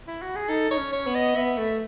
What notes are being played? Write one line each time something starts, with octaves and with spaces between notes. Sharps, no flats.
E4
F#4
G#4
D#4 A4
D#4 C#5
C#4
C#5
B3
D#5
B3 E5
A3